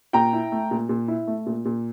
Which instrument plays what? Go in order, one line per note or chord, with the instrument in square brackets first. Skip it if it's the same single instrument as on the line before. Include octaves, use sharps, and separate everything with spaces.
[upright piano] A#2 G5 A#5
E4
A3
A#2
A#2
E4
A3
A#2
A#2